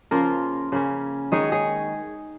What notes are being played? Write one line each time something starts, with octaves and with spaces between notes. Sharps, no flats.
C#3 F3 A#3 F4 A#4
C#3 A#3 C#4
D#3 G#3 D#4 G#4 C#5
G#4 C#5